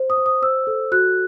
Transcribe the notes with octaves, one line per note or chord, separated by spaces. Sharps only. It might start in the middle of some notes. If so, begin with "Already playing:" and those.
Already playing: C5
D#6
C5
D#6
C5 E6
A4
F#4 F#6